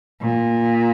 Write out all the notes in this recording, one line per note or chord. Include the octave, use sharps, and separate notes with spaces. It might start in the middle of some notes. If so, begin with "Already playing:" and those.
A#2